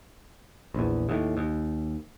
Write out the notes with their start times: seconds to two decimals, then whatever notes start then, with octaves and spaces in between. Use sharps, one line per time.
0.74 A#1 E2
1.09 D#2 A2
1.37 D#2